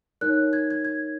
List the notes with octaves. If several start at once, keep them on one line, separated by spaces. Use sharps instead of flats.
D#4 A#4 C#5 F#6
G#6
G#6
G#6